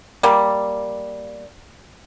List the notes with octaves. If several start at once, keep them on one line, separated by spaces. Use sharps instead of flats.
G3 A#3